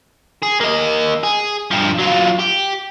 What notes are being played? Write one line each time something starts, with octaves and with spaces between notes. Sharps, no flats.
G#4
A#3 D#5
G#4
G2 F3
F#3 F4
G4